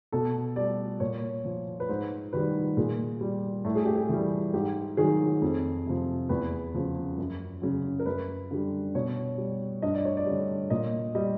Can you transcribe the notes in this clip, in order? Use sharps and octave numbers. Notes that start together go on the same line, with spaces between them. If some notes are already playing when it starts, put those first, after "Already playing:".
B2 A4
G3 D5
A#2 C#5
F3
B4
G#2 C5
D#3 G3 B4
A#2 G#4
G3
A2 A4
G#4
G4
G#4
E3 G3
G#2 G4
D#3 F#3 G#4
F2
C3 F3
E2 B4
C#3 F3
F#2
C#3 F#3
A#4
F#2 B4
D3 G3
B2 C#5
G3
G2 D#5
D5
C#5
D5
D3 G3
A#2 D#5
G3 D#5